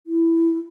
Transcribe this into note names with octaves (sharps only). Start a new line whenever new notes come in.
E4